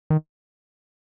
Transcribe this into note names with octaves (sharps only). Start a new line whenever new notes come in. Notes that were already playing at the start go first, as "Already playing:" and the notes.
D#3